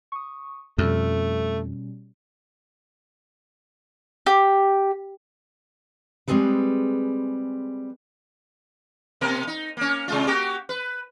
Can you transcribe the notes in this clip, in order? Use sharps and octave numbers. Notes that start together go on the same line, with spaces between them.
C#6 D#6
F2 B2 G3 A3 C#4
G4
G3 G#3 C4 G#4 A4 B4
B2 A#3 A#4
D#4
A#3 C#4
C3 G#3 F4
A#3 F#4 G4
B4